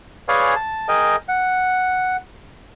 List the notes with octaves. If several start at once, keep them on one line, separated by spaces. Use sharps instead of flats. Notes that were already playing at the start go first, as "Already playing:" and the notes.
G#4 B4 C#5 D5 F5 G#5
A5
G#4 A#4 D#5 G5
F#5